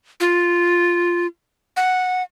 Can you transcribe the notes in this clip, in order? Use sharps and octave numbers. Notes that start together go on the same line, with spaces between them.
F4
F#5